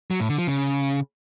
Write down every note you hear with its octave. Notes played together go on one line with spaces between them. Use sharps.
F#3
A2
D3
F3
C#3